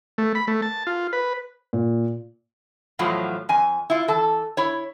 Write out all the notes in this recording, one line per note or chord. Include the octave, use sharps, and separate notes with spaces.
A3
B5
A3
A5
F4
B4
A#2
E2 A2 F3 F#3 F4
F2 G#5
E4 F4
E3 A4 A5
E4 C#5